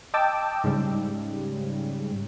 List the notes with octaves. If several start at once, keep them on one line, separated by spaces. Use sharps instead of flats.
D#5 G5 A5 D6 E6
G#2 C#3 G3